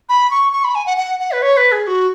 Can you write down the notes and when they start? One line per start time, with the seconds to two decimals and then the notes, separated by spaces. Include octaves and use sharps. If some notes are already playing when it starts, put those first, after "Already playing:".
0.09 B5
0.31 C#6
0.52 C#6
0.64 B5
0.75 G#5
0.86 F#5
0.97 F#5
1.20 F#5
1.32 B4
1.42 C#5
1.57 B4
1.72 G#4
1.87 F#4